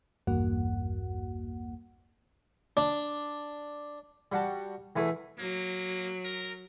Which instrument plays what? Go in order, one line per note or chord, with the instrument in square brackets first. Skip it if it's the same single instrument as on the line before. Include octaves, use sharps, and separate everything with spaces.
[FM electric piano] A#1 E2 G2 A#3 F#4 F#5
[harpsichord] D4
G3 F#4 A5
E2 E3 A3
[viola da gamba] F#3 [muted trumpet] A#3
[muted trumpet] A#4